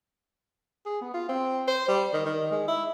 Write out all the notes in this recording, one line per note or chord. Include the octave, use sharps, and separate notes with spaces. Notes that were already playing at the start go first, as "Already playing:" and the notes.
G#4
B3
F4
C4
C5
G3
D#3
D#3
G#3
E4